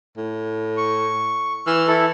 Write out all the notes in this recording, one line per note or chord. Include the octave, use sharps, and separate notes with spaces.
A2
C#6
E3 E6 F6
E4 A4